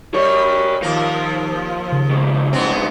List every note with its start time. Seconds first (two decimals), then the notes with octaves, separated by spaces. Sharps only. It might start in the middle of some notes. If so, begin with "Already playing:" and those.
0.14 G3 A#4 C#5
0.82 D#2 F3 A#4
1.92 C#3
2.11 F2 G#2
2.53 G2 B3 C4